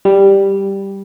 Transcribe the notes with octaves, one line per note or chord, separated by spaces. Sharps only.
G3